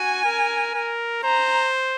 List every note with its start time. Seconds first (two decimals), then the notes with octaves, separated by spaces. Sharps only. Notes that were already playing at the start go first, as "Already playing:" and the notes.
Already playing: F#4 G#5
0.25 A#4
0.74 A#4
1.23 C5 A#5